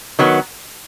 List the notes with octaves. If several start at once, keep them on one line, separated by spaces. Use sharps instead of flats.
D#3 F#3 B3